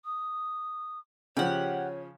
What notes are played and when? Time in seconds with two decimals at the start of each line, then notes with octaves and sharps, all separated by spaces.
0.05 D#6
1.37 C#3 F3 G4 C#5 F#5